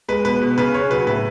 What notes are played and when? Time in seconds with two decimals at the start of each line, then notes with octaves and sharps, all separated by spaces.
0.08 G#3 B4
0.25 B2 B4
0.41 B2
0.58 C#3 B4
0.74 C#3 C#5
0.90 F#3 B4
1.07 A2 B4